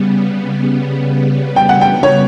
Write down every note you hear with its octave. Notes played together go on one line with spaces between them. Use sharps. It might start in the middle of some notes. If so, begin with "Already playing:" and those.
Already playing: C#3 G3 B3
G5
F#5
G5
C#5